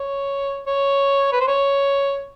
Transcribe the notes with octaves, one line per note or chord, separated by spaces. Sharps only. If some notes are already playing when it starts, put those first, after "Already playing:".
Already playing: C#5
C#5
B4
C5
C#5